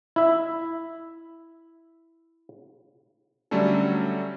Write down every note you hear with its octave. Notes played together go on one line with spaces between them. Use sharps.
E4 E5
D3 F#3 G3 A3 C#4 A4